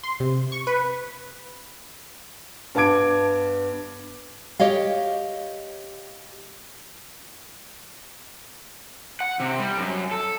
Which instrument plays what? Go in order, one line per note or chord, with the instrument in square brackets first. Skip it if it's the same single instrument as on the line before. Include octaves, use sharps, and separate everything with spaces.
[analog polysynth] C6
C3
C#6
B4
[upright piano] G2 B3 A5 D6 G#6 D7
[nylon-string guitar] G4 C#5 D#5 F5
[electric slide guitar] F#5
C3
G3
F#2
A4